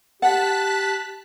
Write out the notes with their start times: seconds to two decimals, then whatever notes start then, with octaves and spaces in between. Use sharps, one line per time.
0.22 G4 F#5 A5 F#6 B6